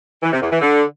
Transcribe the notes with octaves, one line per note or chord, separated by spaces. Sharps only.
E3
C3
E2
E3
D3